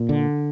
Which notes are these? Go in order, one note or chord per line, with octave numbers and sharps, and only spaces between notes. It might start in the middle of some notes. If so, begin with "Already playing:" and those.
Already playing: A#2
D3